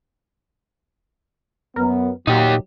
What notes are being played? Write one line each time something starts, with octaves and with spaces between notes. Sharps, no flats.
F#2 B3 A#4
A#2 F#3 D#4 G4